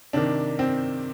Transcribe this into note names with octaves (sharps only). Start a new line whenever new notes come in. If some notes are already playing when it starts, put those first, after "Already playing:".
C3 D#3 D4
C4